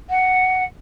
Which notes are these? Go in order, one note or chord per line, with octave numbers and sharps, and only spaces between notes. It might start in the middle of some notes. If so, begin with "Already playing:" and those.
F#5